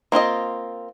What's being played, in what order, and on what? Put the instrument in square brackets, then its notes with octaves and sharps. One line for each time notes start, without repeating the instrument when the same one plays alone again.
[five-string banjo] A#3 C4 F4 D#5